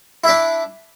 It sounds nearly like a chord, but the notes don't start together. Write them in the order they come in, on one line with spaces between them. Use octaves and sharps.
E4 E5 D4